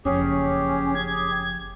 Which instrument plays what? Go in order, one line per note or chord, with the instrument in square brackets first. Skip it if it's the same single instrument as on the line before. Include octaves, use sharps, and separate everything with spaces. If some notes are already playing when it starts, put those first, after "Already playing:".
[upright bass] F#1 F2 [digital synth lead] C#4 [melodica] G4 G#4
[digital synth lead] G#6